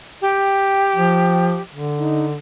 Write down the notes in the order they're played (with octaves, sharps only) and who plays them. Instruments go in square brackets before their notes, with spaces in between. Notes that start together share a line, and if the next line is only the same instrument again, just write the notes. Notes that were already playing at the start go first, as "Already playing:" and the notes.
[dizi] G4 [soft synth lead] G5
[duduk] F3
D3
[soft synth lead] D#4